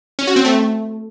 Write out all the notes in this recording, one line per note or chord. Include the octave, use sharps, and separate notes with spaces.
C#4
F#4
C4
A3